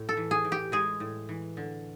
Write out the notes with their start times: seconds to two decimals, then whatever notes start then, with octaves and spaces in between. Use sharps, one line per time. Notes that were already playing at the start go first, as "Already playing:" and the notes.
Already playing: A2
0.09 A4
0.17 E3
0.31 G#4
0.45 A2
0.52 G4
0.72 G#3 G#4
1.00 A2
1.29 E3
1.57 D3